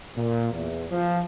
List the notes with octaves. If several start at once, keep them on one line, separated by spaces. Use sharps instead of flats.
A#2
E2
F3